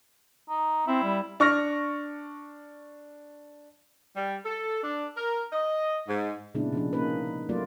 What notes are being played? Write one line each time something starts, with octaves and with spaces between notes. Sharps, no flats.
D#4
C4 E4
G3
D4 C#6 F6 A#6
G3
A4
D4
A#4
D#5
G#2
A#2 C#3 G#3 B3 D4 E4
C3 F3 D4
A#3 C#4 D#4 B4
F#3 A3 A#3 F4 D5